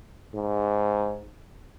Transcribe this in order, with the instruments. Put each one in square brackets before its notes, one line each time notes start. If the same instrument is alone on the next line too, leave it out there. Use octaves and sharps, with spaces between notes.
[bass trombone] G#2